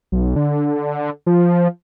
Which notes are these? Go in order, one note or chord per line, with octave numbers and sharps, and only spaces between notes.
B1
D3
F3